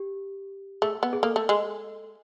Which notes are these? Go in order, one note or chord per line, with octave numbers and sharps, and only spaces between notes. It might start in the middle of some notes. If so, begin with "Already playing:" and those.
Already playing: G4
A3 G#4
B3
G#4
A#3 A4
A3
G#3